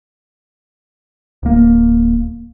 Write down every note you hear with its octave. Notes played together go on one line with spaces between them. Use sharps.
D1 A#3